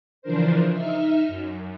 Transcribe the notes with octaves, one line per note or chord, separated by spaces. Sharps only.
C#3 E3 F3 D4 A#4 C5
D#4 E5 F6
F#2